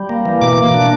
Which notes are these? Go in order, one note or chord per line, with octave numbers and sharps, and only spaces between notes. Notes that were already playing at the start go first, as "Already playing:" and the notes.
Already playing: G3
A#3
E3
B2 D6
A#3
D4